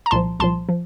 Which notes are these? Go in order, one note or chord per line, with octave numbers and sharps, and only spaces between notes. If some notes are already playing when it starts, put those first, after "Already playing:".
A#5
C2 A#2 F3 A5 C6
C2 A#2 F3 A5 C6
F3